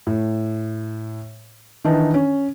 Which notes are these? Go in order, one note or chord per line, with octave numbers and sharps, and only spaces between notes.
A2
D#3 E3 D4 D#4
C#4